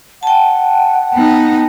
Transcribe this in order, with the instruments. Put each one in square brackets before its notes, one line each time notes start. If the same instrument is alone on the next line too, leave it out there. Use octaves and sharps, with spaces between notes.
[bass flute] F#5 [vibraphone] G5 A5
[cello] B3 D#4